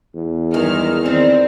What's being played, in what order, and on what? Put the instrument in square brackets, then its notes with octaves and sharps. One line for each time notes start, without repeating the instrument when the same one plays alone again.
[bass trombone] E2
[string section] G2 D#3 F6 [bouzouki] G#3
[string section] D#3 C4 [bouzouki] G3